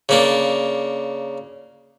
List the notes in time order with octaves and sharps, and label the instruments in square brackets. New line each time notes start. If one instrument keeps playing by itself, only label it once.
[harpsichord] C#3 A#3 D4